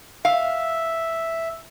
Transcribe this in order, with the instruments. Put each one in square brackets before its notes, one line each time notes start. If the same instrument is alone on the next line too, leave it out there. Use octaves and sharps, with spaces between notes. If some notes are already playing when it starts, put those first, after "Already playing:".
[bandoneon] E5 [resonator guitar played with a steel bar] F5